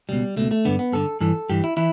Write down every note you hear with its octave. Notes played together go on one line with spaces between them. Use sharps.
C#2 B2 G3
C#2 B2 A3
A3
G2 D3 B3
B3
G2 D3 A4
G2 E3 A4
G2 E3 G4
E4
E3 E4